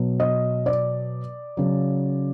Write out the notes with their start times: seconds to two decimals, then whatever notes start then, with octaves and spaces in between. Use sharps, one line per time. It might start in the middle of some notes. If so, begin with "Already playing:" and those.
Already playing: B2 F#3
0.20 D#5
0.66 D5
1.57 C#3 F#3